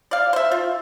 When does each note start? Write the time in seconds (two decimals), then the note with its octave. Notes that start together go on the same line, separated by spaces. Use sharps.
0.11 D5 F5
0.33 C5 E5
0.51 F4